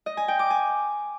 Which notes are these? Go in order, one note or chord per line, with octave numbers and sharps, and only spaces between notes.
D#5
G#5
G5
D6
G#5